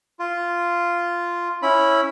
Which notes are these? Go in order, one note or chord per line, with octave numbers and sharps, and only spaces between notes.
F4
C#4 E4 B5